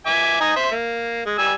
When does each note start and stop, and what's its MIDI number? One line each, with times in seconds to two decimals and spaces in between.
0.06 0.38 76
0.06 0.38 80
0.06 0.38 86
0.41 0.52 63
0.41 0.52 80
0.41 0.52 87
0.56 0.71 72
0.56 0.71 76
0.71 1.26 58
1.26 1.37 56
1.38 1.53 55
1.38 1.53 80
1.38 1.53 88